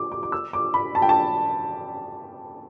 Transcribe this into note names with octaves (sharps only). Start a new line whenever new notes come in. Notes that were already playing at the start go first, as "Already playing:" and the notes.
Already playing: D6
D6
D6
E6
D6
B5
A5
G5
A5